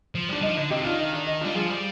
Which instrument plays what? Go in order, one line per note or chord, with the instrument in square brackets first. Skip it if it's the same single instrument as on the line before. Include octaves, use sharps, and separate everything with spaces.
[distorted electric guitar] F3
[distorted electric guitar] G3 [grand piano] D4
[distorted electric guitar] F3 [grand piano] D#4
[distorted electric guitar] D3 [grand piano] D#4
[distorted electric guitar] C3 [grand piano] D#4 G4
[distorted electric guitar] F3
[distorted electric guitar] D#3 [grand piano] D4 F4
[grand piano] D#4
D4
D#4
D4 F4
[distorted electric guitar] G3
[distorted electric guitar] F3 [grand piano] F4 G#4
[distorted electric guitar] G3